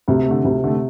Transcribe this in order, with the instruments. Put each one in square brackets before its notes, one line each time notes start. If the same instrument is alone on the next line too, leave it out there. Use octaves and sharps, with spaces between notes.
[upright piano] D2 [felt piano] C3
[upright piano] D3 A3
[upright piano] D2 [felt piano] C3
[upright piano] D3 A3